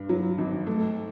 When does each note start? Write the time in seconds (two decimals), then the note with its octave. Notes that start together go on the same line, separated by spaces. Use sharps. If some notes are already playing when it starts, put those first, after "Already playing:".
Already playing: G2
0.09 F#3
0.38 G#1
0.67 A3